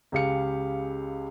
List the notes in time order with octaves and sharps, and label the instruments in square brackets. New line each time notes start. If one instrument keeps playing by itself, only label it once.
[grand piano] C#2 C#3 G4 F5 C#7